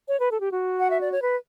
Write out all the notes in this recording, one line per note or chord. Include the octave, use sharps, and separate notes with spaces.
C#5
B4
A4
G4
F#4
F#5
E5
D5
C#5
B4